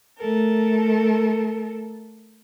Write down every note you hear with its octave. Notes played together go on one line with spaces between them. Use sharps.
A3 A4 A#4